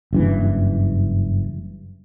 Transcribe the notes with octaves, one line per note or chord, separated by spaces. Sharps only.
F#1 G2 E3